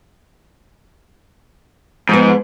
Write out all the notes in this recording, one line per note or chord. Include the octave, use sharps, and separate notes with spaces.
G#2 F3 B3